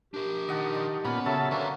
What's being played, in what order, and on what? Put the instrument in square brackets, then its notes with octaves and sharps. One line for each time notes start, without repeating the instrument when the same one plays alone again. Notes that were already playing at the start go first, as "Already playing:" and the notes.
[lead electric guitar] D4 A#4 [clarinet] G4
[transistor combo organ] D#3 [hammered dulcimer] D#5 F#5 A5
[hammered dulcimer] D5 C6
[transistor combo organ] A#2 B5 [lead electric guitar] B3 [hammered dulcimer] C#4 F#5
[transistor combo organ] C#3 A4 A5 [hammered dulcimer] F#3 [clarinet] E5
[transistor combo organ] D3 C#4 [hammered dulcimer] A#3 [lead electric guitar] B4 C#5